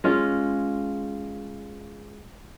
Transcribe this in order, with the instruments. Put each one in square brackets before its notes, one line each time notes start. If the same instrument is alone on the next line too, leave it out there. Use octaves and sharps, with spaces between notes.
[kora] G#3 C#4 F4